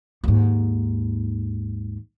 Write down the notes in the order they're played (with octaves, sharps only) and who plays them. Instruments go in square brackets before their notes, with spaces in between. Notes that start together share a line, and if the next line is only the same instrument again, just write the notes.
[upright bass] D#2 G#2